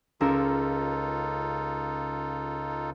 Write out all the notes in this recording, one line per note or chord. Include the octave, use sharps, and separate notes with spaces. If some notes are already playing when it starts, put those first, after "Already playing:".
C#2 C#3 D#4 F4 A4 A#4 E6